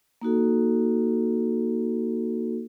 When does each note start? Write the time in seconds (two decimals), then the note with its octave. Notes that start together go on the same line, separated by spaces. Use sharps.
0.21 A#3 D#4 F#4 A4